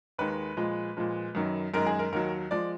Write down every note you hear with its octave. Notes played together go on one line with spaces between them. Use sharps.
D#2 D#3 G#3 B4
A#2 F3 G#3
A#2 F3 G#3
F#2 D#3 F#3
F#2 D#3 G#3 A#4
G#4
A#4
D#2 D#3 F#3 A#4
F3 G#3 D5